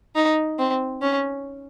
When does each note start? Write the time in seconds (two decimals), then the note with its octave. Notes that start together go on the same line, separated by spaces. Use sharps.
0.15 D#4
0.59 C4
1.02 C#4